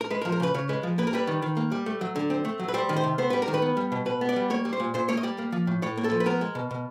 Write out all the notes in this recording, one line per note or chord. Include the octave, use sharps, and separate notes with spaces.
A#4
G#3 B4
A#4
F3
A#4
C#3 B4
C#3 C#5
G#3 B4
F3
A#3 B4
A#4
G3 B4
D#3
D#3
A#3
G3
A3
F#3
D3
C4
A3
F#3
B4
G3 C5
D#3
C5
C3
B3 C5
G3 B4
A#4
D#3
B4
B3
G3
B2
B2 B4
B3
D5
G3
A#3 C#5
G3
C5
A#2
A#2 C5
A#3 C#5
D#5
G3 D5
A#3
F3
A2
A2 C#5
A#3
A4
F3
B4
B3 A#4
G#3
B2
B2